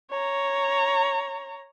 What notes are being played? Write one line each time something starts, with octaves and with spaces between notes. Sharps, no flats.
C#5 A#5